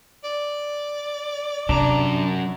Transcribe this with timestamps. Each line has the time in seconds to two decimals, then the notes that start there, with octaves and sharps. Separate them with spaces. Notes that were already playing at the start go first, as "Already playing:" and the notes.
0.24 D5
1.69 G1 F#2 C3 D4 A#5